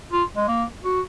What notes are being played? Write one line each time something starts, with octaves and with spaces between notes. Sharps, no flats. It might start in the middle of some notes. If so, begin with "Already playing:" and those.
F4
G#3
A#3
F#4